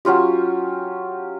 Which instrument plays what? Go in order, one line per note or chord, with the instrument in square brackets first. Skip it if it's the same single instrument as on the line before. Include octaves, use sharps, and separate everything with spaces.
[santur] F#3 C#4 F4 G4